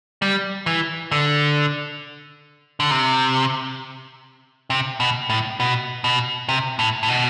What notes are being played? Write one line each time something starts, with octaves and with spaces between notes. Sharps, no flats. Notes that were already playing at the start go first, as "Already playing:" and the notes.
G3
E3
D3
D3
C3
C3
B2
A2
B2
B2
C3
A2
A2
B2